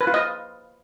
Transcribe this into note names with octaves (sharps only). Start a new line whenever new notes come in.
B4
F4
D#5